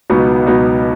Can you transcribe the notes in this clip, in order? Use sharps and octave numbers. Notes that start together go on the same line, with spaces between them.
C#2 B2 F#3 B3 D#4
C#2 B2 F#3 B3 D#4